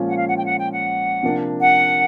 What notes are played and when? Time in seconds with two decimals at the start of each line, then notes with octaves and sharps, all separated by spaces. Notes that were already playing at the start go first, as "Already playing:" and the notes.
Already playing: A#2 F3 G#3 C#4 F4
0.08 F#5
0.18 F5
0.27 F#5
0.37 G5
0.46 F#5
0.59 G5
0.72 F#5
1.23 C3 F3 A#3 D4
1.61 F#5